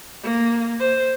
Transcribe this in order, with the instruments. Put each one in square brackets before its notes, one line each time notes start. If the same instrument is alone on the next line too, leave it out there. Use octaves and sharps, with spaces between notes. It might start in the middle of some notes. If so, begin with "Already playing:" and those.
[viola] A#3
C5